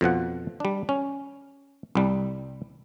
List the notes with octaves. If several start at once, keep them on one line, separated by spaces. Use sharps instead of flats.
F2 B2 F3 F#5
G3 D4
C#4
C2 G3